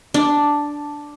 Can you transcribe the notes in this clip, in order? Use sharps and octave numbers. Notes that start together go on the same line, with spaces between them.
D4